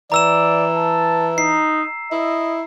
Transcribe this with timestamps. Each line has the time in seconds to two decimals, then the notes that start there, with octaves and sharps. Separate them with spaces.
0.12 E3 D5 A#5 E6 E7
0.76 A5
1.38 D#4 C7
2.12 E4 D#5